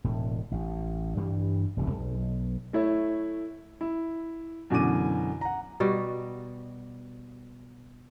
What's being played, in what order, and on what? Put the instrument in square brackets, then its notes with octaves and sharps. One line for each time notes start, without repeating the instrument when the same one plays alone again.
[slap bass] E1 A2
A1
G2 E3 G3
E1 C2 E3
B1
[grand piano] A3 E4 C#5
E4
F#2 B2 D3 E3 D6 D#7
F#5 A#5
[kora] B2 G3 F#4